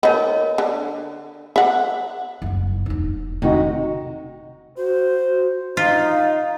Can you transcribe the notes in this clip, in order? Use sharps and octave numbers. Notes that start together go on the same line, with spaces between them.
B3 D#4 A#4 C#5 D#5
D3
E5 F#5
F#1 G2
E1 D#4
C3 D#3 D#4 F#4
F#4 C5
D#4 F4 F5